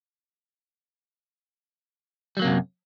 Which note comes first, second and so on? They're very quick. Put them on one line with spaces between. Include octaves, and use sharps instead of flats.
G3 F#3 A#3 C3 F#2